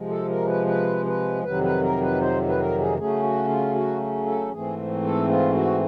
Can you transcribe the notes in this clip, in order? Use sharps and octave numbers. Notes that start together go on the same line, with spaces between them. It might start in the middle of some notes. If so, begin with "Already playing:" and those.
Already playing: C3 F3 G#3
A4
A#4
B4
B4
B4
F2 C3 D#3 F#3 B4
B4
A#4
B4
C5
B4
A#4
G#4
C#3 F#3 A3 C#4 G#4
F#4
F4
F#4
A4
G#2 E3 A3 C4 G#4
A4
F4
F#4